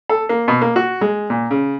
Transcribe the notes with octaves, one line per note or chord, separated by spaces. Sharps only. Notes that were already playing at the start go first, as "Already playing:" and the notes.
A4
A#3
B2
A#3
F#4
G#3
A#2
C#3